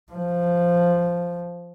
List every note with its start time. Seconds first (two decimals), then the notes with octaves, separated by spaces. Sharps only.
0.12 F3